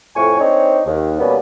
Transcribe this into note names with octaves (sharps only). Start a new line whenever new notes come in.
F2 A2 G#5 C#6
C4 D4 D#4 C#5
D#2
B2 G3 A#3 B3 C#4